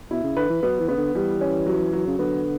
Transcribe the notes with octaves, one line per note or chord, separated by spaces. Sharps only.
B2 E4
C#3
D3 B4
E3
F#3 B3
E3
C#3 B3
D3
E3 G3
C#4
F#3
F#3
C#3
D3 B3